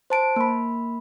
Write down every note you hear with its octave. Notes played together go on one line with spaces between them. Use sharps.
C5 A5 D7
A#3 B5